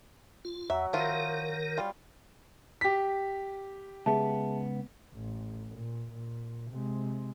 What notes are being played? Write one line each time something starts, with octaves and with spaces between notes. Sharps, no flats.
F4
E2 F#3 E5
D#3 F3 E4 F4 A#4
G3 F4
G4 B6
C#2 B3 G#4 E5 A5
A1
A#2
A#2
C3 G#3